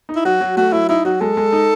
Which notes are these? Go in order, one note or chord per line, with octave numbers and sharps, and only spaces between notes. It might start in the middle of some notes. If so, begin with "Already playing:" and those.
D#4
E4
F#3 F#4
F#3
A3 F#4
F#3 E4
D#4 E4
F#3 F#4
G#3 A4
G#3
D#4